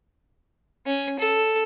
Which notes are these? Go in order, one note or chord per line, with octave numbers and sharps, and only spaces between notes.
C#4
A4